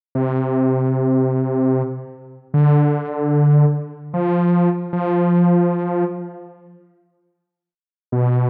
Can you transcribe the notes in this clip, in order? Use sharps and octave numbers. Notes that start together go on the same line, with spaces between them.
C3
D3
F3
F3
B2